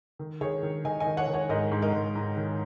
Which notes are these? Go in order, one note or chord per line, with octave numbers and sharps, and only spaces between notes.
D#3
D#3 G#4 C#5
D#3
D#3 D#5 G#5
D#5 G#5
D#3
C#5 F#5
D#3
C#5 F#5
G#2 A#4 D#5
G#2
A#4 D#5
G#2
G#2
D#3